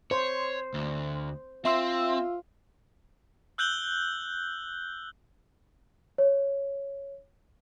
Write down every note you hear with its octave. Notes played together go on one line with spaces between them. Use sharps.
C5 C#5
D2
C4 F4 E5 C6 E6
E6 F#6 G6 F#7 G7
C#5